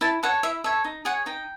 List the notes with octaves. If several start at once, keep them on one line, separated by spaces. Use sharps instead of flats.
E4 A5
A4 C#5 F#5
E4 E5
A4 C#5 E5
D#4
G#4 C#5 F#5
D#4 G5